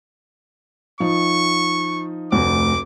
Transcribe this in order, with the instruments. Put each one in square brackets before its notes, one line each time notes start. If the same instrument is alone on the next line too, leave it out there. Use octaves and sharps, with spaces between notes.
[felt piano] F3 D#4 [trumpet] C#6
[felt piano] F1 D2 [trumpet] D6